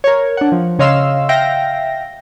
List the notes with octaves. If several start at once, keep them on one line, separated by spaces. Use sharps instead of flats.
A#4 C#5
D4 F#5
F3
C#3 C#5 D#5 F5 C6 E6
E5 F5 G5 A#6